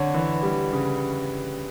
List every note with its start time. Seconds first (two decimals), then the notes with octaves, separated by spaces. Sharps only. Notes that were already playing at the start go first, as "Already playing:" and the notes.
Already playing: D3 C#5
0.14 E3
0.43 G3
0.73 C#3